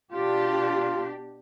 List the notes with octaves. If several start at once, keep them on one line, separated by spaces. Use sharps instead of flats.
B2 D4 F4 G4